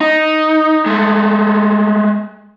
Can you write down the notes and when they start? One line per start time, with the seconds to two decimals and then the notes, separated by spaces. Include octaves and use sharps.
0.01 D#4
0.86 G#3 A3